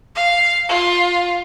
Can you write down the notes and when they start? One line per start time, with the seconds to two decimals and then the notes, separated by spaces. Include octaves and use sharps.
0.16 F5
0.69 F4